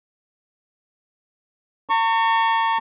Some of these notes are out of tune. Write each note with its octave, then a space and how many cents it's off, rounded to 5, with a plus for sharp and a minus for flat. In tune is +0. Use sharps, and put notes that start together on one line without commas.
A#5 -45 C#6 +0